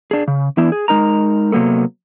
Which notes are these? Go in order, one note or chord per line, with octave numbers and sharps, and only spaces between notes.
D4 G#4
C#3
E3 B3 D4 E4
G#4
G#3 D#4 A#4 A#5
C3 F#3 A#3 B3 A4